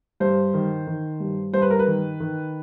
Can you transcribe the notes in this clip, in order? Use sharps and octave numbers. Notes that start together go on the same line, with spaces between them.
G2 C5
D#3
D#3
G2
G2 C5
B4
A#4
B4
D#3
D#3